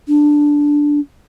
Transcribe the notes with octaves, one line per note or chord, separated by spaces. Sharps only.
D4